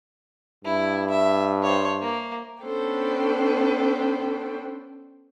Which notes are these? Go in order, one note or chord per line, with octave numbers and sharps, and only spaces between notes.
G2 E4
E5
C5 C#5
A#3
B3 C#4 D4 A4 C5 G5